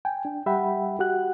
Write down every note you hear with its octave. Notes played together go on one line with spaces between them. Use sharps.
G5 G#5
D4
G3 G4 E5 F#5 G5 B5
F#4 G4 F#5 F#6